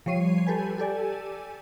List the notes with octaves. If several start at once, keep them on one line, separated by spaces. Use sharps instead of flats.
F3 G3 C#5 C7 D#7
G4 A4 B4 G#5
G4 A4 D5 G#5